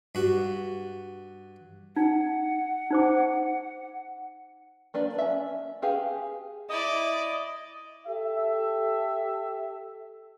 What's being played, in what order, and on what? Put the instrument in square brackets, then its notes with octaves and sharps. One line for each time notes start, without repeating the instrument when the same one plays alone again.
[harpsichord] G2 F#4
[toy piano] D#4 [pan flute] F#5
[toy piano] D#4 C5 D6
[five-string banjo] A#3 D4 B4
C#4 E5
G4 G#4 B4 F5
[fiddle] E4 D5 [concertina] D#5
[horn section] G4 A4 E5